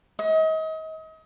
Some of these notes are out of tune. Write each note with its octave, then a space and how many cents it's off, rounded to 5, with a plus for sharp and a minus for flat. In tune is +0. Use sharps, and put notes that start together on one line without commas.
D#5 +35